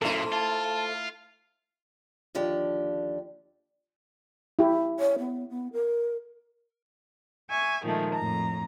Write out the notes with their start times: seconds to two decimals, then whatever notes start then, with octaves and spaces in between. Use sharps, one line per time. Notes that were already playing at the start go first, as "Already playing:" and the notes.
0.02 F#2 A#2 A3 E4 A4 C5 C6
0.32 F4 A5
2.35 D#2 D3 F3 D4 G4
4.59 E4 G4
5.00 C#5
5.19 B3
5.50 B3
5.73 A#4
7.50 E5 G#5 C#6
7.84 A#2 D#3 F3 G#3 A3
8.14 F2 A2 A#5